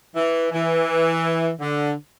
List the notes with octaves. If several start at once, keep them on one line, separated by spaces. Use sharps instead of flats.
E3
E3
D3